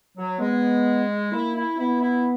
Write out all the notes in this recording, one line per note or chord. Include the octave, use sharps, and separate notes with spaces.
F#3
G#3 B3
A#3 E4
E4
B3 E4
E4